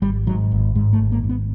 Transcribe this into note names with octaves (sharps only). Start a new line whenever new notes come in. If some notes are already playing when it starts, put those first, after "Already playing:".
G#1 G3
G#2 F#3
G#1
G#2 G#3
A3
G#1
A#3
G#2
B3